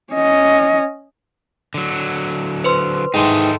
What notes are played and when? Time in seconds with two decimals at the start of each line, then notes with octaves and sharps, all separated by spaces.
0.13 C#4 D#5
1.74 D3 F#3
2.64 B4 C5 C6
3.14 G#2 D#3 E3 D#4 A4 G5 C6